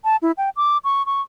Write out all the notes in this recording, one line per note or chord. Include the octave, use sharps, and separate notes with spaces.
A5
E4
G5
D6
C#6
C#6